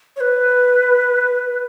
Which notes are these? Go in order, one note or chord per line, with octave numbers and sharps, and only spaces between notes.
C#5
B4